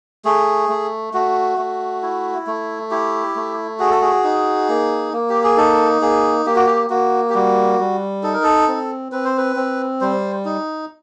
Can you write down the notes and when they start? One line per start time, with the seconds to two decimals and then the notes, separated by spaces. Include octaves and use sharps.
0.25 A3 G#4
0.69 A3
1.14 A3 F#4
1.58 A3
2.03 E4
2.47 A3
2.91 E4 G4
3.36 A3
3.79 F#4 G#4
3.91 A4
4.01 G#4
4.24 D#4
4.69 A#3
5.13 A#3
5.30 G4
5.43 G#4
5.57 D#4 A4
6.02 A#3 G#4
6.46 A#3 G4
6.56 F#4
6.66 G4
6.90 A#3 F#4
7.30 G4
7.35 G3 F#4
7.79 G3
8.23 D#4 A4
8.33 A#4
8.43 A4
8.68 C4
9.12 C4 B4
9.25 C5
9.38 B4
9.56 C4
10.01 G3 C5
10.45 D#4